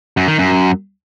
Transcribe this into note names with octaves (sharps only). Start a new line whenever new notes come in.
F#2
D#3
F#2